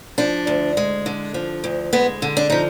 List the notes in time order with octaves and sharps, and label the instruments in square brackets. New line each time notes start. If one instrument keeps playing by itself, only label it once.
[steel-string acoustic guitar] F3 D4
D2
G#3
D3
F3
D2
G#3 B3
D3
D4
F3 D#4